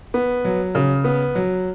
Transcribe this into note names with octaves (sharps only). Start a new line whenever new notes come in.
B3
F#3
C#3
B3
F#3